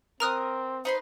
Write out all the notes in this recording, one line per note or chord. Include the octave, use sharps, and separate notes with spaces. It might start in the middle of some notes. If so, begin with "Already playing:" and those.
C4 A#4 A#5 D#6 F6 F#6
D#4 B4 C5 C6